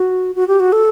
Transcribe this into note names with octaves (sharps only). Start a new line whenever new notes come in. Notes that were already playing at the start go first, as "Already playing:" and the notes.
Already playing: F#4
F#4
G4
F#4
A4